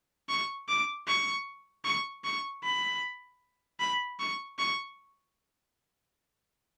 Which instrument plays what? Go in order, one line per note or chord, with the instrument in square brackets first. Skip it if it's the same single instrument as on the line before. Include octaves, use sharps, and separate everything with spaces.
[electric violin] C#6
D6
C#6
C#6
C#6
B5
B5
C#6
C#6